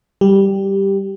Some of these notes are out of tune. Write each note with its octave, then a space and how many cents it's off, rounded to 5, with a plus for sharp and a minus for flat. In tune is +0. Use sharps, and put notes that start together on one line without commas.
G3 +0 G4 +0